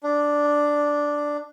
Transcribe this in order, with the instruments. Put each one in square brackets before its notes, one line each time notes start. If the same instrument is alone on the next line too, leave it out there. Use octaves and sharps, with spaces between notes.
[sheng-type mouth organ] D4